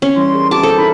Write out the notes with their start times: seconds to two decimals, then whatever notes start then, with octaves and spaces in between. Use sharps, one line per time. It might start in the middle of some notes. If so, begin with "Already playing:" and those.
0.02 C#4
0.16 E3 G3 E4 C6
0.33 G#4 A#4
0.51 E4 F#4 G#4 A5 D6
0.63 A4 C5
0.77 D#4 E4 A#4 B5